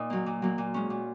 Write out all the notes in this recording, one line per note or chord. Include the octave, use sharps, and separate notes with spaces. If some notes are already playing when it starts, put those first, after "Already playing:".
Already playing: A#2 D#4
F#3 A#3
A#2
F#3 A#3
A#2
G#3 C#4
A#2